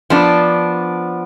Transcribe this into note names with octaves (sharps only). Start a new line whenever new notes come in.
F3 B3 D4